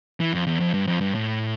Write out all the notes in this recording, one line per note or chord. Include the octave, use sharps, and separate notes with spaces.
E3
F2
E2
F2
G2
F2
G2
A2